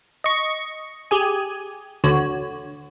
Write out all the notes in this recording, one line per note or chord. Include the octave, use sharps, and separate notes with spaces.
D#5 C#6
G4 G#4 G#5
D2 D3 F#4 C#5